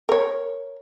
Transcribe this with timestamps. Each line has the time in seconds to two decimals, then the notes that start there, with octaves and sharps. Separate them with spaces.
0.09 A#4 C#5